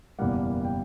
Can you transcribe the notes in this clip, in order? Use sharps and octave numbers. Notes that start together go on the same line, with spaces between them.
F#1 E2 B2 G3 A#3 F#5
G5